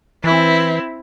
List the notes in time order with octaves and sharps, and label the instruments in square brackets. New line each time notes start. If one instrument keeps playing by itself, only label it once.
[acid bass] E3 [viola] C4 E4